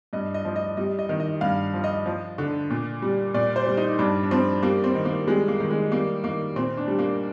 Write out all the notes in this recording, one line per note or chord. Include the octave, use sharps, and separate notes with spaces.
G2 D#5
D#5
F3
D#5
G3 D#5
D#5
D#3
D#5
G2 F5
F3
D#5
F3
D3
A#2
G3
A#2 D5
C5
G3
D#4
G2 D4
D4
F3 C4
G3 A#3
C4
D#3
A#3
G3 G#3
A#3
D#3
G#3
G3 A#3
D#3 A#3
A#2 C4
D4
G3
A#3